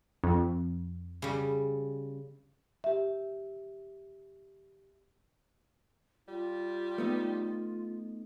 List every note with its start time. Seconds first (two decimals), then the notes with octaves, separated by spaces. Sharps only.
0.24 F2
1.22 C#3 G3
2.84 G4 E5
6.28 G3 F4
6.98 A3 B3 D#4